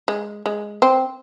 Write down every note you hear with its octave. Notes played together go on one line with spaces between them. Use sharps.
G#3
G#3
C4